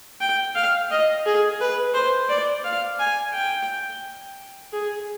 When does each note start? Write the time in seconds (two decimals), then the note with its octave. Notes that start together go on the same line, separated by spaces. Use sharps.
0.21 G5
0.55 F5
0.90 D#5
1.26 G#4
1.60 B4
1.94 C5
2.29 D5
2.65 F5
2.99 G#5
3.34 G5
4.73 G#4